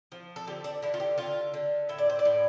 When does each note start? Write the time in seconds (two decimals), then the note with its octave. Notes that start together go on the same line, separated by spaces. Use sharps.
0.12 F3
0.36 A4
0.47 D3 G4
0.64 D4
0.82 D3 E4
0.94 F4
1.00 G4
1.18 D3 F4
1.54 D3
1.89 A2 E5
1.98 D5
2.10 C5
2.19 D5
2.25 A2